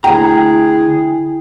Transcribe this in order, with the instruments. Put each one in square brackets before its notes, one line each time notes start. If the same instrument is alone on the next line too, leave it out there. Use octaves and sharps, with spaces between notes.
[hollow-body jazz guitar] D2 A#5 [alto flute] E4 [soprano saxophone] G#4 [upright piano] G5